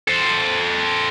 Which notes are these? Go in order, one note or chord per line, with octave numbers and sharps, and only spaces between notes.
A4 C5